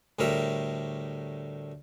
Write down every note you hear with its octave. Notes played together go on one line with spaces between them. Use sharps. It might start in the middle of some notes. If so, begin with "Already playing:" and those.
D2 A2 G3 A#4 E5